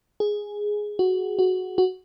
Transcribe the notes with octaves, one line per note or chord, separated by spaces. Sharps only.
G#4
F#4
F#4
F#4